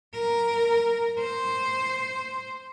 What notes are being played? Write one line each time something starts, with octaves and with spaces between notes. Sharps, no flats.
A#4
C5